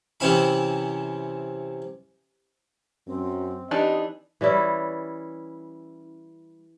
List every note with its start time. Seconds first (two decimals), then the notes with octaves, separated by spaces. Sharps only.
0.20 C3 E3 C4 C#4 E4 B5
3.07 F#2 C4
3.71 E3 D4 D#4 G4 D#5
4.41 E3 G3 C#4 E4